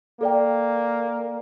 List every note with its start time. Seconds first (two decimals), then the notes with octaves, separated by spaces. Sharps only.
0.21 A#3 A4 D5 G5